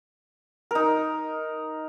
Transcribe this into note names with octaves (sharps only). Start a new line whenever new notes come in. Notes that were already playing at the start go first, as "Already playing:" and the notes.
D#4 A#4